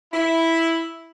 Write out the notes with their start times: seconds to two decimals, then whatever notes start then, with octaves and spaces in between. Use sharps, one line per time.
0.13 E4